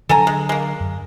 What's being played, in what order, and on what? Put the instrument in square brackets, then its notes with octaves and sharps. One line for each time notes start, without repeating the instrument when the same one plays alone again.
[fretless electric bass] D3 F#3 D4 [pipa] A4 G#5 A#5
[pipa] G#3
G#3 A#3
[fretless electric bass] F#2